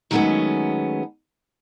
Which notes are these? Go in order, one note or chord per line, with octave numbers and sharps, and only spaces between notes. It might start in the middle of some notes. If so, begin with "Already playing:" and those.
D#3 F#3 G#3 A3 B3 C#4